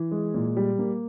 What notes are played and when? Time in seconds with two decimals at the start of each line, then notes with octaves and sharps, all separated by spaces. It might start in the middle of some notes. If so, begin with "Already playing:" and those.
Already playing: E3
0.11 G#3
0.34 A#2
0.57 G3
0.79 A#3